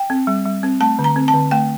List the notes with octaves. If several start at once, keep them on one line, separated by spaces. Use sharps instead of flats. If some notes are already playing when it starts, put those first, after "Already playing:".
Already playing: G5
C4
G3
G3
C4
A3 A5
D3
A#5
C4
A5
D3
A3 G5